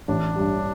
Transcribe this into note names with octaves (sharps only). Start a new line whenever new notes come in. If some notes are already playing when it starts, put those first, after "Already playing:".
A1 D4
G2 G3